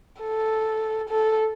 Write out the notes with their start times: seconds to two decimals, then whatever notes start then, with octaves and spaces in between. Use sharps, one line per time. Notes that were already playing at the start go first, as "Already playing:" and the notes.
0.21 A4
1.09 A4